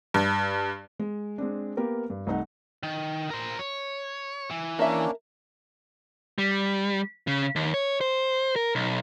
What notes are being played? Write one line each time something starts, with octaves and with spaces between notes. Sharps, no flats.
G2
G#3
G#3 C4 D4
A#3 B3 G4 A#4
G2
C2 A3 D#4 F#5
D#3
A#4 C5
C#5
E3
A#3 C#4 D4 A#4 E5
G3
C#3
D#2
C#5
C5
A#4
B1